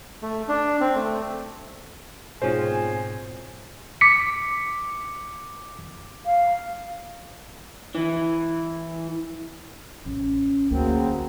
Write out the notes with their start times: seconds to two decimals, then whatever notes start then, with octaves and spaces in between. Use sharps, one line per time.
0.22 A3
0.48 D4
0.81 C4
0.95 A3
2.42 G#2 B2 C4 F4 G#4 C5 C#5 G#5
4.01 D6 B6 C#7
6.25 F5
7.95 E3
10.06 A1 C#4
10.71 D2 C#3 F#3 A#3 C4